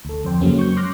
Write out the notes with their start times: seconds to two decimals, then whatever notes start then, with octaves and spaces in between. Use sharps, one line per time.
0.05 D2 A4
0.25 F2 C5 G5
0.41 F#2 C#3 F#3 G#3 A#3 C#4
0.59 C#6 G6
0.77 C6 D6 F6 F#6 A#6